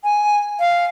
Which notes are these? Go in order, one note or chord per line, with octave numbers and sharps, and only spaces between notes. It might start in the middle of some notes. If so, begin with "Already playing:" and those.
G#5
F5